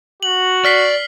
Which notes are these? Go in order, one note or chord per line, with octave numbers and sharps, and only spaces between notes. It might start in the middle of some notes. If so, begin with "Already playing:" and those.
F#4 F#7
D5 F6 B6 C7